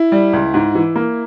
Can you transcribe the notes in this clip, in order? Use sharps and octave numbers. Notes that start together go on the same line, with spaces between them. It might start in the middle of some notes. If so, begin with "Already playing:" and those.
Already playing: E4
G3
C#2
G#2
E3
A#3